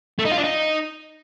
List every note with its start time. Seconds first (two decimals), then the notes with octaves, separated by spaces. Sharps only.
0.19 A3
0.25 D#4
0.31 F4
0.38 D4
0.44 D#4